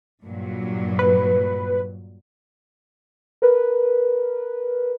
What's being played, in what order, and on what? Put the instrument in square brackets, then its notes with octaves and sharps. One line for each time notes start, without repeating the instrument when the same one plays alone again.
[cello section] G2 A#2 F#3
[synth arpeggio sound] B4
[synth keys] A#4 B4